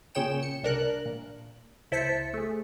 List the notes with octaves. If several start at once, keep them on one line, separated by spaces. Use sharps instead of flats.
A#2 C#3 G#4 C#5 G5 E7
C#7
C2 D4 A#4 F#6
A#2
C#2 E4 C5 A5 B6 C#7
A3 G#4